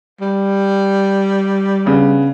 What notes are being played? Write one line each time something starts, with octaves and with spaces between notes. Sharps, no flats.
G3
C#3 B3 D4